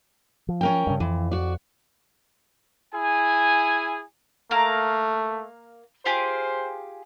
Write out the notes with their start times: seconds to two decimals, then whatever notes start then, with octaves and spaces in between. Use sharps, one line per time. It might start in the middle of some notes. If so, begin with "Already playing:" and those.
0.49 F3
0.61 C#4 A#4 G5
0.87 G2 C#3
1.00 F2 E3
1.31 F#4 D5
2.94 E4 G#4 G#5
4.51 A3 A#3 F5 A#5
6.05 F4 G4 G#4 C5